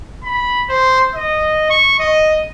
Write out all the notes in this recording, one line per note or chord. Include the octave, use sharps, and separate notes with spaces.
B5
C5
D#5
C#6
D#5